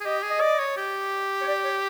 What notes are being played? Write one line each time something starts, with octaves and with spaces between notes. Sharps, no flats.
G#4
G4 D#5
G#4
D#5
D5
C#5
G4
C#5
D5
C#5